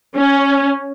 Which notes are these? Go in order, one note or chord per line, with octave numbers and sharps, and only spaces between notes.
C#4